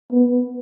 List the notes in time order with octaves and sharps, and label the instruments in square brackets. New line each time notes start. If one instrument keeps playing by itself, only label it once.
[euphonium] B3